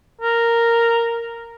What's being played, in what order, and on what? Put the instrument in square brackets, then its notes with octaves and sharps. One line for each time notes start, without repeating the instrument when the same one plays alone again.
[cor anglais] A#4